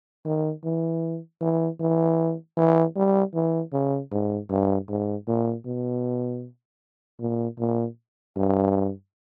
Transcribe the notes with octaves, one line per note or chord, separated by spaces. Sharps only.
D#3
E3
E3
E3
E3
G3
E3
C#3
G#2
G2
G#2
A#2
B2
A#2
A#2
G2